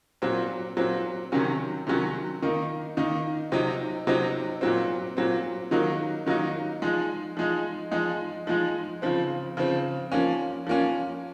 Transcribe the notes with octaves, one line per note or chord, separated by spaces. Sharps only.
A#2 F#3 C4
A#2 F#3 C4
C3 D#3 F#3 C#4
C3 D#3 F#3 C#4
D#3 A#3 D#4
D#3 A#3 D#4
C3 F#3 C4 D#4
C3 F#3 C4 D#4
A#2 F#3 C4
A#2 F#3 C4
D#3 F#3 A#3 D#4
D#3 F#3 A#3 D#4
F3 G#3 D#4
F3 G#3 D#4
F3 G#3 D#4
F3 G#3 D#4
C#3 F3 C4
C#3 F3 C4
F3 A#3 C#4
F3 A#3 C#4